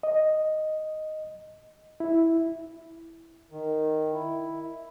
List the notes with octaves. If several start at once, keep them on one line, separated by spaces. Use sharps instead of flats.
D#5
E4
D#3
E4